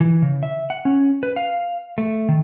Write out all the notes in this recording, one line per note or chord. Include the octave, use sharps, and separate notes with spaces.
E3
C#3
E5
F#5
C#4
B4
F5
A3
D#3